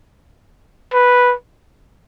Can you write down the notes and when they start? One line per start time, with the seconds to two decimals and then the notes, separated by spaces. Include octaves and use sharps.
0.93 B4